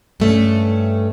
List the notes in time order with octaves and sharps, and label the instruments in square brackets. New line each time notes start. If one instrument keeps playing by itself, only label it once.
[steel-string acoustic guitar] G2 A3 C#4